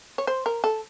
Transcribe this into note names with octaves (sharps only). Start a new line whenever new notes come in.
C#5
C5
A#4
A4